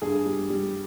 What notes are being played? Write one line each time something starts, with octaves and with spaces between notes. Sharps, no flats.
G2 G#4
G3
G3